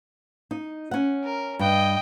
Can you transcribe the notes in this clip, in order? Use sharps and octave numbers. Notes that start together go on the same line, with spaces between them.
D#4
C#4 F#5
A#4
G2 D#5 G5